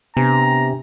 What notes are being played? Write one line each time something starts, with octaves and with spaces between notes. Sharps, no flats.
C3 B3 D4 G4 G#5 A#5